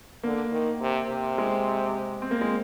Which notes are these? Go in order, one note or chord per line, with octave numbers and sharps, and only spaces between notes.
D3 A#3
D#3
C3
C3
G#3
C4
A#3
G#3